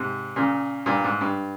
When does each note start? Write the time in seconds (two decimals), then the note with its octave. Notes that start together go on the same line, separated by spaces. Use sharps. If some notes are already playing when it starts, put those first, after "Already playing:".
Already playing: G#2 C3
0.36 A#2 C#3
0.86 G2 A#2
1.04 G#2
1.21 G2